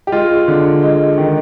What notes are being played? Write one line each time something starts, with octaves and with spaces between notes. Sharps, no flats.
G4
G#3 F4
D3
G#3
D#3